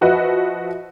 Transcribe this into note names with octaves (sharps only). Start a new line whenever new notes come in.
F3 F#4 B4 D#5 E5